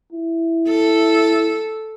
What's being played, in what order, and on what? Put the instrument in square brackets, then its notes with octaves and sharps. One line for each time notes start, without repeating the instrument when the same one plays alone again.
[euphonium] E4
[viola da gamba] A4